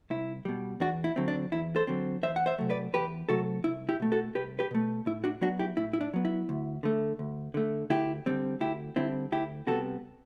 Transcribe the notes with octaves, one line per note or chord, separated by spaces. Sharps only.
C2 E4
B2 G3
E2 D4 F#4
E4
D3 F#3 C4
D4
E2 E4
A4 C5
D3 F#3 C4
E2 C5 E5
F#5
C5 E5
C3 F#3 A3
B4 D5
E2 G4 B4
C3 F#3 A3 F#4 A4
C2 E4
E4 G4
B2 A3
F#4 A4
C2 G4 B4
G4 B4
B2 A3
A2 E4
D4 F#4
F#3 B3 D4 F#4
E4 G4
A2 E4
E4
D4
F#3 B3
E4
D2
D3 A3
D2
D3 A3
D2 E4 G4
D3 G3 C4
D2 E4 G4
D3 G3 C4 E4
D2 E4 G4
C3 G3 B3 F#4 A4